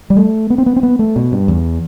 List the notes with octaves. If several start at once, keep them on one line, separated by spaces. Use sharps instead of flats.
G3
A3
B3
C4
B3
C4
B3
A3
B2
G2
E2